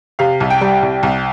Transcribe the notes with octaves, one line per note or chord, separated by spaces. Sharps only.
C3 F5
C2
G5
G3
C2
C2